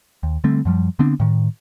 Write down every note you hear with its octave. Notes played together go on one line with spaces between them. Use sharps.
D#2
D3 G3 A3 C4
F#2 F3 G3
D3 B3 C4 D4
A2 D#3